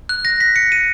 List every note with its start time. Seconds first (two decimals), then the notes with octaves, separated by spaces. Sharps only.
0.09 F#6
0.25 A#6
0.40 B6
0.56 C#7
0.72 D#7